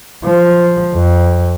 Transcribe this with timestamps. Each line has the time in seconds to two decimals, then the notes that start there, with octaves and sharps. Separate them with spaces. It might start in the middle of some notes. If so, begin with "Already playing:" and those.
0.24 F3
0.94 F2